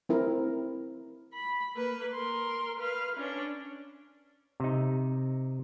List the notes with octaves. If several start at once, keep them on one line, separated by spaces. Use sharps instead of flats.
C4 E4 A#4
B5
A#3 B4
A#4 C6
B4 F5
C#4 D4
C3 D#4